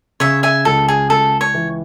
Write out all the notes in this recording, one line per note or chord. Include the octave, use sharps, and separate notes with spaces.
C#3 C#5 E5
E5 G#5
C#2 A4
G#4
C#2 A4
C#5
E3